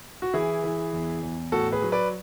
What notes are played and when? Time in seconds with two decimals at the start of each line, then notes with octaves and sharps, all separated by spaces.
0.22 F#4
0.33 E3 E4 G#4
0.64 E3
0.93 E2
1.23 E2
1.52 A2 F#4 A4
1.72 G#4 B4
1.82 F#3
1.92 B4 D5